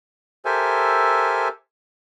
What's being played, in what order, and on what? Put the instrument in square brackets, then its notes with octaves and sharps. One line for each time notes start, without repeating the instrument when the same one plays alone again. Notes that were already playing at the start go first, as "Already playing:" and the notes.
[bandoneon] G4 A4 A#4 C5 E5 G#5